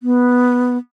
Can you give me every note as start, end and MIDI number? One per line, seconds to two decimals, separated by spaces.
0.03 0.78 59